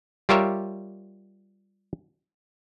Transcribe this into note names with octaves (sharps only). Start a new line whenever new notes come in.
G3 F4 G4 A#4 C#5 E5